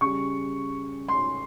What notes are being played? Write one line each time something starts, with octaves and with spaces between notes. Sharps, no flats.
C#3 G3 C#6
C6